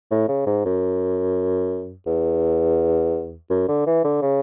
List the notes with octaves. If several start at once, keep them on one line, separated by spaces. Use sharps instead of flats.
A2
C#3
G#2
F#2
E2
F#2
D3
E3
D3
C#3